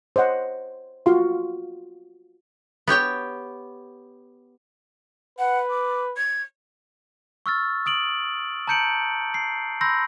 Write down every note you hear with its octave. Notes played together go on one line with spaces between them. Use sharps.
C5 C#5 D#5 F#5
F4 F#4 F5 C6
B3 G4 C#5 G5
B4 F#5
D6
G#6
C#6 E6 F6 A6
D#6 D7 F#7
A5 A#5 G6 C#7 D7 F#7
C7
B5 C6 E6 G6 A#6